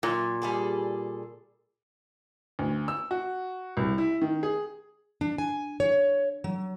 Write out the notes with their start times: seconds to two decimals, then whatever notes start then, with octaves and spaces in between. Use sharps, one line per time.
0.03 A#2 F#3
0.42 G3 G#4 A4
2.59 D2
2.88 E6
3.11 F#4
3.77 C2
3.98 E4
4.21 D#3
4.43 G#4
5.21 D4
5.38 G#5
5.80 C#5
6.44 F#3